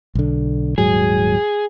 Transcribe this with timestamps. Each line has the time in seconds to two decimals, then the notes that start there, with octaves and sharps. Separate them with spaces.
0.15 B1 D3
0.78 D#1 G#2 F#3 G#4